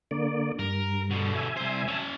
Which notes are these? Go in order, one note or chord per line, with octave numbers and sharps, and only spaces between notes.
D3 A#3 D5
G2 A#4
B2 D3
E5 G#5
C2 C5
C#4 A5